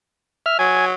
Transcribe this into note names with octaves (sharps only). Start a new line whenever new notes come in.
E5 F6
F#3 G#5